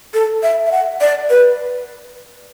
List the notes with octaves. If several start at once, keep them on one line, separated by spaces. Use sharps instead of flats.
A4
E5
E5
F#5
D5
B4